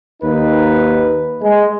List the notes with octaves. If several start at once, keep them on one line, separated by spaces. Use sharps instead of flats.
D#2 D#4 B4
G#3